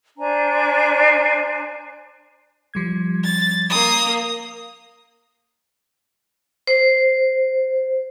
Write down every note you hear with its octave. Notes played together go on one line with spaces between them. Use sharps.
D4 C5 G#5 A#5
F3 G3 G#6
A6
A#3 D#6
C5